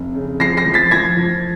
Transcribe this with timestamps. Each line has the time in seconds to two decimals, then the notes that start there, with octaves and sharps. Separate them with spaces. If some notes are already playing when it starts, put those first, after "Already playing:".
Already playing: F1
0.15 C#3
0.40 F3 A#6 C7
0.57 A#6 C7
0.66 F3
0.74 A6 B6
0.91 F3 G#6 A#6
1.17 F3